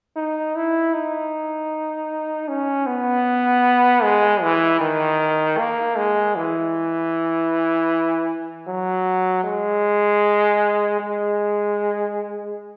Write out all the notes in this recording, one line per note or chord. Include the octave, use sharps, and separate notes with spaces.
D#4
E4
D#4
C#4
B3
G#3
E3
D#3
A#3
G#3
E3
F#3
G#3
G#3